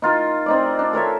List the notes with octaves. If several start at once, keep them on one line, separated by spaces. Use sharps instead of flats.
D#4 F4 A#4
C4 D#4 D5
D4
A4 A#4 C#5 E5